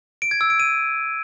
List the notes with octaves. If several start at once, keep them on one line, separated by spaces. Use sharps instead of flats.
D7
G#6
E6
D7
D#7